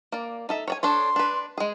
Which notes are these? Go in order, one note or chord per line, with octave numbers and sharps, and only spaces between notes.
A#3 D5
D#4 A4 E5
C#5 D5 G#5
D4 A4 C#5 C6
D4 B4
G#3 G#4